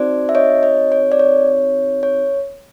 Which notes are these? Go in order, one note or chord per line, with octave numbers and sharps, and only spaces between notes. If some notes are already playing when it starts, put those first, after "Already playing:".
Already playing: C4 D#4 F#4 C5 D5
E5
C#5 D#5
C#5 D#5
C#5
D5
C#5
C#5